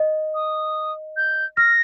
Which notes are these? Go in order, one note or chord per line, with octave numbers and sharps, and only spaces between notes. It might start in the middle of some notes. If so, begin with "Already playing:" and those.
Already playing: D#5
D#6
G6
F6 A#6